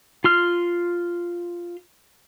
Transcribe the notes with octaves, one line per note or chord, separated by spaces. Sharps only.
F4 C6 F6